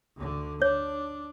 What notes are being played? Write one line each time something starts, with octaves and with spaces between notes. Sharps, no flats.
D2 D3
D4 C#5